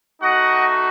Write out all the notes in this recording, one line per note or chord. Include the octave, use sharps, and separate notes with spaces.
A3 D#4 F#4 D#5 F#5